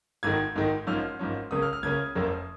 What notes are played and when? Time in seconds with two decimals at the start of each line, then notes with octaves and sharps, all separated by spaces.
0.23 G#1 G#2 D#3 G#6
0.55 G#1 G#2 D#3
0.87 G#1 G#2 F3 C#4 F6
1.19 G#1 G#2 F3 C#4
1.51 C#2 C#3 A#3 C#4 D#6
1.62 F6
1.73 F6
1.83 C#2 C#3 A#3 C#4 G#6
2.15 F1 F2 F3 A#3 C#4